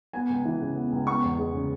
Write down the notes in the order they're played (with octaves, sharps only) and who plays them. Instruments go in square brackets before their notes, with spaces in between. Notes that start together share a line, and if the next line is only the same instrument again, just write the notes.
[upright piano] B3 G#5
C#2
E3
C#3
B3
C#2
B3 C#6
E2
G#3
C#3